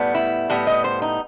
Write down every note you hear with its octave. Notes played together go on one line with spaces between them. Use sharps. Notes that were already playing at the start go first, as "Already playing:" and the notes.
Already playing: A2 G3 B3
E4
A2 G3 B3
D#5
C5
D#4